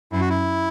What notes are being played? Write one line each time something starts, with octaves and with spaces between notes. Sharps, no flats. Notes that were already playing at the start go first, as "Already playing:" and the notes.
F#2 E4
F#4
E4